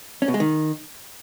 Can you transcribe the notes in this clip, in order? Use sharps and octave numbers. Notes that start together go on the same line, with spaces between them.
C#4
B2
G#3
D#3